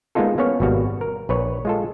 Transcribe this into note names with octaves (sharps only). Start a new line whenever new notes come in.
G#3 A#3 B3 D#4 F4 A4
A#3 B3 C#4 C#5 F5
G#1 B2 G3 F#4 F5
A#4
A#1 B4 C#5
G#3 F4 A4